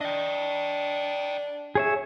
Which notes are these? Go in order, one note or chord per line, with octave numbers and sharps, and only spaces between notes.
D4 D#5 G5
G#4 C#5 E5